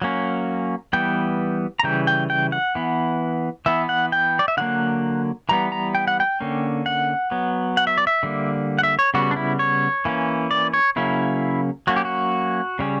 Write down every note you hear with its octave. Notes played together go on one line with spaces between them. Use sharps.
F#3 A#3 C#4
E3 G3 B3 G5
A#5
C#3 E3 G3 G5
G5
G5
F#5
E3 B3
E3 B3 E5
F#5
G5
D5
E5
D3 F#3 A#3 F#5
E3 G3 B3 A#5
A#5
G5
F#5
G5
D3 A#3 C#4
F#5
F#3 B3
F#5
E5
D5
E5
D3 G3 A#3
F#5
E5
C#5
C#3 G3 B3 F#4
D4
E4
C#5
E3 A#3 C#4
D5
C#5
C#3 F#3 A#3 C#4 E4
F#3 A#3 C#4 F#4
G4
F#4
C#3 G3 C#4